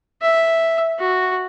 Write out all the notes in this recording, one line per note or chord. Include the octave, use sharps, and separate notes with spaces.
E5
F#4